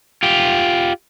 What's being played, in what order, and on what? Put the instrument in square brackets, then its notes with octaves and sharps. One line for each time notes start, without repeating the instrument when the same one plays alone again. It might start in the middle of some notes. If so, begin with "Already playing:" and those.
[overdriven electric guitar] F4 G4